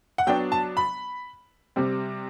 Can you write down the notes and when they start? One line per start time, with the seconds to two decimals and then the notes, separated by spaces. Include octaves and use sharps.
0.18 F#5
0.27 F#3 B3 D4 G5
0.52 A5
0.77 B5
1.76 C3 G3 C4